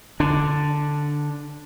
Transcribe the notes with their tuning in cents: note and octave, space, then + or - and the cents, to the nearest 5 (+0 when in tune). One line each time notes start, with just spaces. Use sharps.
D3 +0 D4 +0